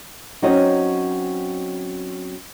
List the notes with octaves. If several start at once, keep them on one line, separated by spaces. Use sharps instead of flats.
F#3 C4 C#4 D#4 F#4 D#5